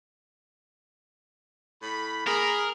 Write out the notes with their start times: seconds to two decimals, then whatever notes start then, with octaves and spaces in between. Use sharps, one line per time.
1.83 A2 B5
2.27 A#3 G#4 A#4 A#5 B5